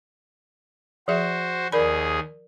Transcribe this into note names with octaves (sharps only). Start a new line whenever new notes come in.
F3 F#4 G#4 C5 E5
D#2 G#4 A#4 D5 B5